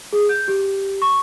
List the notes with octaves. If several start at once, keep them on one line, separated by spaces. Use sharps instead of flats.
G#4
G6
G4
C#6